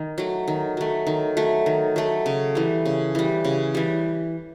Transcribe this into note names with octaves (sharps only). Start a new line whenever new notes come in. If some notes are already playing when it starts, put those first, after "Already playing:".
Already playing: D#3
F#3 A3
D#3
F#3 A3
D#3
F#3 A3
D#3
F#3 A3
C#3
E3 G3
C#3
E3 G3
C#3
E3 G3